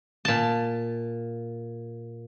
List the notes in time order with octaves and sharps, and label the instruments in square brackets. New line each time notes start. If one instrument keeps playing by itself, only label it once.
[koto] A#2 A5